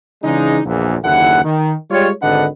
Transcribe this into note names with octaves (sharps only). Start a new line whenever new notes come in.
C#3 E3 G#3 D4 D#4
A#1 E2 A#2
F#1 D#2 D3 E4 F#5
D#3
G3 G#3 F4 C#5
G#1 D3 D4 B4 D#5 F#5